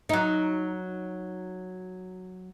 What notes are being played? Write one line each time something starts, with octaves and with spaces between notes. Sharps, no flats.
F#3 D#4